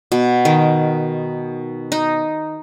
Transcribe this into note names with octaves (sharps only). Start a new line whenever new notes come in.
B2
D#3
D#4